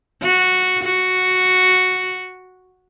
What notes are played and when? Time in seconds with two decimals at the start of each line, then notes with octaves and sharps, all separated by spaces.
0.22 F#4
0.83 F#4